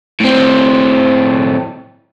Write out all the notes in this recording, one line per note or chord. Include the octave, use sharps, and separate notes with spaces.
A2 C4